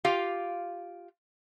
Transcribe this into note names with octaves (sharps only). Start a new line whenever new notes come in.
F4 G4 F5